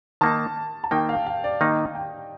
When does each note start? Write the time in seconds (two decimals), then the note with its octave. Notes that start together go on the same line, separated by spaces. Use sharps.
0.21 D#3 A#3 D#4 A5
0.84 A5
0.91 D#3 A#3 D#4 G5
1.09 F5
1.26 F5
1.44 D5
1.61 D#3 A#3 D#4 D#5
1.95 G5